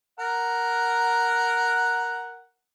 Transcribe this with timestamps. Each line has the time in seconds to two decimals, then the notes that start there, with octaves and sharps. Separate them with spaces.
0.19 A#4 F#5